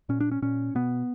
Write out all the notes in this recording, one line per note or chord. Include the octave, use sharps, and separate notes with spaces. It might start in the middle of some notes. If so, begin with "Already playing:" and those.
A#2 C#4
D4
C#4
A#2 C#4
B2 B3